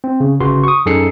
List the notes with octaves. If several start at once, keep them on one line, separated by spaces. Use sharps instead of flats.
C4
C#3
G1 C#3 F#4 B4 C6
C#6 D#6
F#2 D#4 G#4 A4 C7 C#7